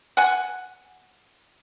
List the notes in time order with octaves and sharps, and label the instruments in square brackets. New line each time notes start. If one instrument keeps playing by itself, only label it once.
[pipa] F#5 G#5